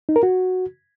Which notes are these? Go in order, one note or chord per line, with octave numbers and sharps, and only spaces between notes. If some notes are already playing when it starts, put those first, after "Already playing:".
D#4
A#4
F#4